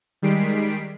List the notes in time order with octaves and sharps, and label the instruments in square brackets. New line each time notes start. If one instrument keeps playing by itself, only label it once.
[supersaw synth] D#3 G3 G#3 B6 C7 D7